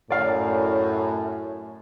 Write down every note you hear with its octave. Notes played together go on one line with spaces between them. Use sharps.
F#2 A2 D5 F5